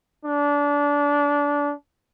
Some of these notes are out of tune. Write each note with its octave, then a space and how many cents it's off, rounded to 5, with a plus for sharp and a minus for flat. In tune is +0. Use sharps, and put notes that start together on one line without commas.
D4 -25